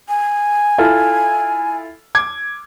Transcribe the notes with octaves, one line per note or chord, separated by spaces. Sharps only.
G#5
E4 F4 A4
D6 G#6